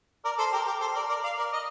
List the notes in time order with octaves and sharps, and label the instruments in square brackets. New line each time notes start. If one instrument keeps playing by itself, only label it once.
[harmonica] A#4 D5
A4 C5
G4 A#4
G4 A#4
A4 C5
A#4 D5
A#4 D5
D5 F5
A#4 D5
D#5